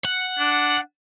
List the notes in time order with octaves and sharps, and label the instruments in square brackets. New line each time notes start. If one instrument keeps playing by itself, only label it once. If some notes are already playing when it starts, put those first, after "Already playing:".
[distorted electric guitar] F#5
[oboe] D4